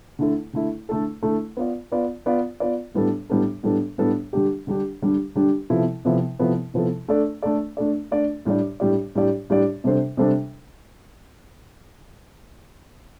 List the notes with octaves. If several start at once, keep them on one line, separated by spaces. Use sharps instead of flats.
D3 A3 E4 A4
D3 A3 E4 A4
D3 A3 E4 A4
D3 A3 E4 A4
B3 F4 B4 D5
B3 F4 B4 D5
B3 F4 B4 D5
B3 F4 B4 D5
A2 G3 B3 D4 A4
A2 G3 B3 D4 A4
A2 G3 B3 D4 A4
A2 G3 B3 D4 A4
D3 G3 D4 G4
D3 G3 D4 G4
D3 G3 D4 G4
D3 G3 D4 G4
C3 F3 B3 E4 A4
C3 F3 B3 E4 A4
C3 F3 B3 E4 A4
C3 F3 B3 E4 A4
A3 D4 A4 D5
A3 D4 A4 D5
A3 D4 A4 D5
A3 D4 A4 D5
A2 G3 D4 G4 D5
A2 G3 D4 G4 D5
A2 G3 D4 G4 D5
A2 G3 D4 G4 D5
C3 G3 D4 A4 C5
C3 G3 D4 A4 C5